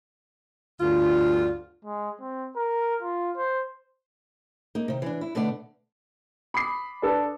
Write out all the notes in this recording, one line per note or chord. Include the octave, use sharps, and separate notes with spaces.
D2 G2 D3 F4
G#3
C4
A#4
F4
C5
A#3 D#4
C3 D#3
E3 D4
E4
B2 D3 A3 B3 D5
B5 D6 D#6 C7
D4 A4 B4